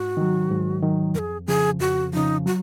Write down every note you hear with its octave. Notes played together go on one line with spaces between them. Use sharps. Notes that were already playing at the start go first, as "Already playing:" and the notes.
Already playing: G#2 F#4
D#3 F#3
G#2
D#3 F#3
F2 G#4 A#4
C#3 F3 G#4
F2 F#4
C#3 F3 D#4
F#3 F#4